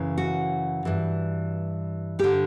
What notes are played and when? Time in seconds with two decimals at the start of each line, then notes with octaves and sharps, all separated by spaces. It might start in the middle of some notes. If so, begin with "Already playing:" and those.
Already playing: F#2 C#3 E3
0.18 F#4
0.85 G2 E3
2.19 G2 D3 G4